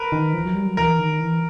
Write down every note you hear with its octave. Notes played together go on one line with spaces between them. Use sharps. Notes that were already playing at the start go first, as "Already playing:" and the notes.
Already playing: A#4 B4
D#3
F3
F#3
G3
F#3
E3 A#4
D#3
E3